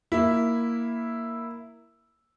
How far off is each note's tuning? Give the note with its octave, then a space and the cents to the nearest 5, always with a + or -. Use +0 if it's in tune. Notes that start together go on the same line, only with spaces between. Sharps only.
A#3 +0 E4 +0